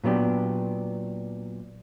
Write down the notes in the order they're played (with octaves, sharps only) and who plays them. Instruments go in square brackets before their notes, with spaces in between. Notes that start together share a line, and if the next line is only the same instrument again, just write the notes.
[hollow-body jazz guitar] A#2 F#3 B3 D4 G4